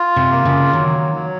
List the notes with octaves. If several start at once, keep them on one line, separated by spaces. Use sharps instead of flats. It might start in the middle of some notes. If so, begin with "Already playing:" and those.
Already playing: F4
C3
A#3
C#3
D#3 F#3
F#3